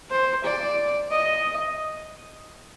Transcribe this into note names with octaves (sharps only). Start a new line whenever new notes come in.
C5
D5
D#5